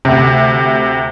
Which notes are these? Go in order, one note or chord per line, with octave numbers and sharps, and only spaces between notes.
D2 C3